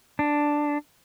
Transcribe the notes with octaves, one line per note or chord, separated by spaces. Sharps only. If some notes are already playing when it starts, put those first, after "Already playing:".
D4